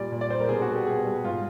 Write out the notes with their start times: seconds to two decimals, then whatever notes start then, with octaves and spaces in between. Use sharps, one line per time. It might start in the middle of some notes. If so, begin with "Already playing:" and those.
Already playing: A#2 G3 D5
0.12 A#2
0.21 D5
0.30 G3 C5
0.40 A#4
0.49 B2 G#4
0.62 F#4
0.68 G3
0.75 G4
0.86 B2 G#4
1.05 G3
1.24 G#2 F4